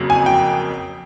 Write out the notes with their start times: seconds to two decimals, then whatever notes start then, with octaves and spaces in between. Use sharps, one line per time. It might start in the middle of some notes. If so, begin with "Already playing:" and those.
Already playing: F2 C#3 F#3 A#3
0.10 G#5
0.26 G5